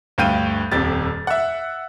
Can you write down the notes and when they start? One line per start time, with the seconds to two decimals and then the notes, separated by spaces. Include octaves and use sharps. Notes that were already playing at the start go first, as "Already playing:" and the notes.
0.18 D2 G2 F5 G5 G6 D#7
0.72 D#1 F2 G4 A6
1.27 E5 F#5